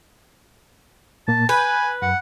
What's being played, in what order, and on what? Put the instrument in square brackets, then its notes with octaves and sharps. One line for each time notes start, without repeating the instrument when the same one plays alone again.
[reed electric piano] A#2 A#3 [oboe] A5
[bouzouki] B4 [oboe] G#5 [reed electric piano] G6
[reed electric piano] F#2 [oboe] F#5